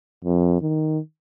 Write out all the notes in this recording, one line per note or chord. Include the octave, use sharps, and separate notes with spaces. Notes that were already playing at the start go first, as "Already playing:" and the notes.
F2
D#3